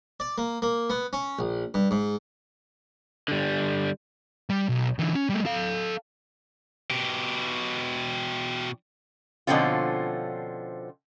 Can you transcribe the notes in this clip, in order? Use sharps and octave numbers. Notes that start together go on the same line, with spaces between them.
D5
A#3
A#3
B3
C#4
A#1
G2
G#2
D3 G3
G3
B1
D3 E3
C#4
G3 A3
A4 F5
B2 G4
B2 D3 F3 C4 C#4 F4